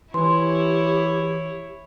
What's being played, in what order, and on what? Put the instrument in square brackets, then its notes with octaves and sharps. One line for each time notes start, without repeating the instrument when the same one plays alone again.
[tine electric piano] E3 [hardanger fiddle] E4 C#5 [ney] G4 [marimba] C6